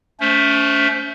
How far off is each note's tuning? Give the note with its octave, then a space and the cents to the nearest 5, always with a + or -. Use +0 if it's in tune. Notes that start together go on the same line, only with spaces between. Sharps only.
A3 +0 C#4 +35 C5 -5